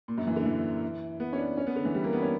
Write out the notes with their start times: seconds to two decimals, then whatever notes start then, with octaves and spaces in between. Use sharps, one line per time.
0.08 A#2
0.18 F#2
0.27 E3
0.36 D3
0.46 E3
1.20 B3
1.33 C#4
1.38 D4
1.57 C#4
1.67 B3
1.76 D3
1.85 E3
1.94 G3
2.04 A#3
2.13 B3
2.23 C#4